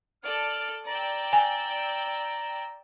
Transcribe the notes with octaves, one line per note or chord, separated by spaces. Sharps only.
A4 D5 F6
D5 G5 A#5 E6
G#5